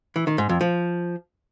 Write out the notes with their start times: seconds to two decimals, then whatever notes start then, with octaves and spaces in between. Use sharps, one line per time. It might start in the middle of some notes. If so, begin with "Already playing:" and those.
0.16 E3
0.27 D#3
0.38 G#2
0.49 F2
0.61 F3